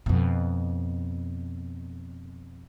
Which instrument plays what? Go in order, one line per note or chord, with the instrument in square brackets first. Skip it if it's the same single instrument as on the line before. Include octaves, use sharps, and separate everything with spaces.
[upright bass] F2 B2